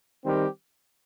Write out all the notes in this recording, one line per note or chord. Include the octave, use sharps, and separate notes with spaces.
D#3 G3 C4 G4 A#4